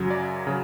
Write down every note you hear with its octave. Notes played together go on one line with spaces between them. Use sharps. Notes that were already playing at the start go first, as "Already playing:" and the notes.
Already playing: F#2 C#3 F#3
D5
C#3 F#3